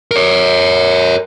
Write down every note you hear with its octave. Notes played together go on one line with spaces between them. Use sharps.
A#4 C#5